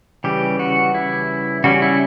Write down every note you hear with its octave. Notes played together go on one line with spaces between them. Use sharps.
C#3 E3 G3 G4
F#4
E4
C#3 G3 C#4 F#4
E4